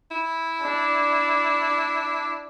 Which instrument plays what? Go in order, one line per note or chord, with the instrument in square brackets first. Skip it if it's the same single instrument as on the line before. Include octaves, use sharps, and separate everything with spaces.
[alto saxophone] E4
[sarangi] D4